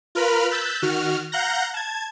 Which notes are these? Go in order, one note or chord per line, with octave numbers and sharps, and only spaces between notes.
F4 A#4 B4 B5 F6
E6 F#6 G6 A6 B6
D#3 F#4 F6
F5 F#5 A#5 F#6 G6 A#6
A5 G#6